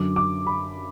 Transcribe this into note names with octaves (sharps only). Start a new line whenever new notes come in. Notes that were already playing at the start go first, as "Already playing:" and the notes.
Already playing: F#2 D3 D6
D6
B5